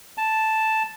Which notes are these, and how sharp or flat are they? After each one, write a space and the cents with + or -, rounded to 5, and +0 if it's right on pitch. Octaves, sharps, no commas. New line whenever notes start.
A5 +0